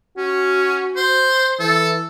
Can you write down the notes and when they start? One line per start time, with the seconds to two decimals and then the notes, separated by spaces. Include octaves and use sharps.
0.17 C#4 F#4
0.96 C5
1.59 E3 A4